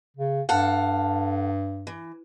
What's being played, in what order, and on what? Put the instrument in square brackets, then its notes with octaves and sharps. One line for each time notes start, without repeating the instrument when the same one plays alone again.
[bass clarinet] C#3
[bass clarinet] G2 [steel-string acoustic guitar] A4 F5 F#5
[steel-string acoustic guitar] E3